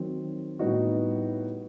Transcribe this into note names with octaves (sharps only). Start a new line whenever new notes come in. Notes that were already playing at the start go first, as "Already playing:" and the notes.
Already playing: D#3 F#3 C4
A2 G3 B3 D#4 F#4